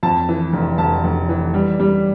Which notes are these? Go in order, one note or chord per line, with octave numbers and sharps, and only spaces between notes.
F2 A5
E3
F1
F1 A5
F1
E3
G3
G3